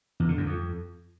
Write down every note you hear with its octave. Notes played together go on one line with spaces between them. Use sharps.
E2
D3
F#2
F2